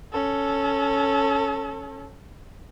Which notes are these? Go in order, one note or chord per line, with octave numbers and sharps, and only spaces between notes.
C#4 A4